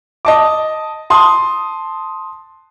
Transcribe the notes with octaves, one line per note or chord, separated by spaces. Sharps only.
D#5 A5 D6
A5 C6 D#6